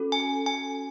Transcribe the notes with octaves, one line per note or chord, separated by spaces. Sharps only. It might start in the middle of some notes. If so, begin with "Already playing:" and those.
Already playing: C#4 F#4 A4
G#5
G#5